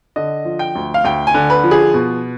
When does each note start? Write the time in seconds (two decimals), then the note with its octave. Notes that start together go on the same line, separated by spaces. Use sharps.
0.16 D3 D#5
0.45 F3
0.59 G5
0.75 D2
0.94 F5
1.04 D2 G5
1.27 G#5
1.34 D3
1.50 B4
1.64 F3
1.71 G#4
1.94 B2